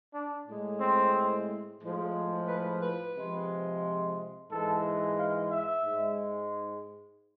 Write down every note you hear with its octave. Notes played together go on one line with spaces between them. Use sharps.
D4
A2 G#3
C4
A2 F3 G#3
B4
B4
C3 F3 G#3
G#2 E3 G#3 A4
F5
E5
G#2 G#3